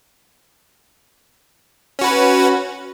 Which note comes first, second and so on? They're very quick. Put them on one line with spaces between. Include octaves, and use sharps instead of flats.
C#4 F#4 B4